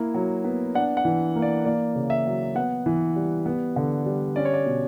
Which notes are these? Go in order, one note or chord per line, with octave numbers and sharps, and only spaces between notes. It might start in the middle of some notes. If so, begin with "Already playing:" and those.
Already playing: A#3 E4
F#3
B3
D4 F#5
F#5
E3
A#3
D5
A#3 D5
C#3
E5
F#3
B3 F#5
E3
G3
B3
D3
G3
C#4 D5
C#5
D5
B2